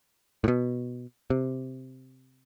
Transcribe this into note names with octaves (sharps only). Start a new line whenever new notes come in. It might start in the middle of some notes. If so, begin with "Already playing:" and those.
A2
B2
C3